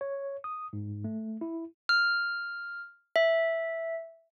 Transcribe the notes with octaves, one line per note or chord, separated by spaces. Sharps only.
C#5
D#6
G#2
A3
E4
F6
E5